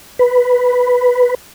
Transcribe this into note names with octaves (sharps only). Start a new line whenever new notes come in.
B4